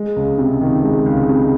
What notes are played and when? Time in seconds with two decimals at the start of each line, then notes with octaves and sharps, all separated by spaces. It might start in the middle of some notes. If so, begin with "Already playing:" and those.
Already playing: G#3
0.16 C#2
0.38 C3
0.61 D#3
0.83 G#3
1.06 C#2
1.29 C3